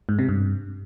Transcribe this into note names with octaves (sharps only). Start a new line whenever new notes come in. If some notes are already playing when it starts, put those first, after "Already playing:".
G#2
C3
G2